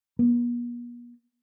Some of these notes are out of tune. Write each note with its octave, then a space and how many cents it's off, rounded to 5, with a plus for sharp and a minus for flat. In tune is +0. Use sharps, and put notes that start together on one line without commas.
B3 -45